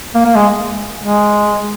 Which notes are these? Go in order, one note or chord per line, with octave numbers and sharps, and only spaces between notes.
A#3
A#3
G#3
G#3